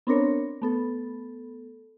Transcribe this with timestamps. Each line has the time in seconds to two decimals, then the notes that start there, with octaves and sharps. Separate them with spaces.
0.07 B3 C4 D4 A#4 C#5
0.62 A3 B3 A4